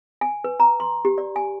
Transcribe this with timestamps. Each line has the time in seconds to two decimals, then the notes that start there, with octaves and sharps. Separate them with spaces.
0.21 G#5
0.44 B4
0.60 A#5
0.80 C6
1.05 G4
1.18 D5
1.36 G#5